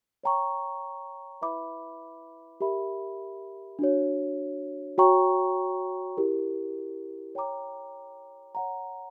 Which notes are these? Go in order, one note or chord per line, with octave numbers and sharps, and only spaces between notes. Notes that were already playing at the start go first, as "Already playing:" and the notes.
C#5 G5 A#5 C#6
E4 B4 E5 B5 D6
G4 A#4 E5 B5
D4 F#4 C#5
F#4 C#5 G5 A#5 C#6
E4 G4 A#4
C#5 G5 A#5 D6
C#5 F#5 A#5